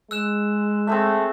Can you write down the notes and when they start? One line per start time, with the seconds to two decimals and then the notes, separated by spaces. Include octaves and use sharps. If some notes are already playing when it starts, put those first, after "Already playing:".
0.11 G#3 E6 F#6 E7
0.87 A3 C4 G#4 E5